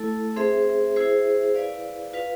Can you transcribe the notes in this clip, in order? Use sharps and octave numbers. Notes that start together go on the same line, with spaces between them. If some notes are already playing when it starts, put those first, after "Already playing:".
Already playing: A3 E4 A4
C4 G#4 C5 E5
E4 G#4 C5 E5
E4 B4 D5 F5
F4 B4 F5